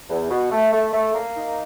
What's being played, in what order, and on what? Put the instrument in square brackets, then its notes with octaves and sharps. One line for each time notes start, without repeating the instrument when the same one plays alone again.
[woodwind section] E2
B2
A3
A3
A3
A#3
D#4